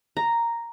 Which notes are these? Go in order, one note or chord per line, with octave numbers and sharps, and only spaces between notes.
A#5